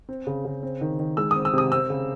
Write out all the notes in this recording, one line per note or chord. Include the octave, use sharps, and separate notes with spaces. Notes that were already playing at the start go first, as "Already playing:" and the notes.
C4
C#3
C#3
C4
D#3
D#3
G#3 E6
D#6
C4
E6
C3 D#6
C4 E6
C#3